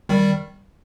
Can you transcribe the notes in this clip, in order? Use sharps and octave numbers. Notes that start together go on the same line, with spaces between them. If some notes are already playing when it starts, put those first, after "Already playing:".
D#3 G3